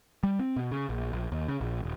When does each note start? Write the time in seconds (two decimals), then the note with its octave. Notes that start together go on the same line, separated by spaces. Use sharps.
0.23 G3
0.39 C4
0.56 B2
0.71 C#3
0.89 A#1
1.13 A#1
1.32 D#2
1.48 C#3
1.61 A#1
1.83 D#1